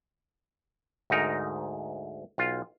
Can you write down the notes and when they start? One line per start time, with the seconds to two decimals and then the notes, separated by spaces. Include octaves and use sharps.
1.10 D2 G#2 D#4 A#4
2.38 B1 F4